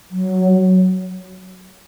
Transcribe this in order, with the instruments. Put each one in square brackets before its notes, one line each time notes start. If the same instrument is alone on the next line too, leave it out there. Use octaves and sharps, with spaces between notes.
[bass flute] F#3